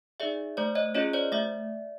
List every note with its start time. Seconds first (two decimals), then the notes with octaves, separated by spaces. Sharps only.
0.20 D#4 G#4 D5 E5
0.57 A3 C5 D5
0.75 C#5 D#5
0.95 C#4 F4 G#4 C#5 D#5
1.13 C5 D5
1.32 A3 D5 E5